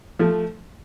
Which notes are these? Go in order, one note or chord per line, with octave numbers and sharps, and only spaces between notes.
F3 A3